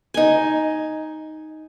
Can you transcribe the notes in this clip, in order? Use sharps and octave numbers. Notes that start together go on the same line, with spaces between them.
D#4 G#5